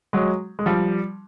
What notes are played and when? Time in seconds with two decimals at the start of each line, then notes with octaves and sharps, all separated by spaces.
0.13 F#3 G#3
0.59 G#3
0.66 F3 G3